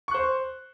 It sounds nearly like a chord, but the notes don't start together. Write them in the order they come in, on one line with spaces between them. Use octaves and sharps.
C#6 F#6 C5